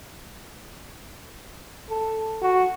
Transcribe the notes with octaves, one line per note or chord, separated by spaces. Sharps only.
A4
F#4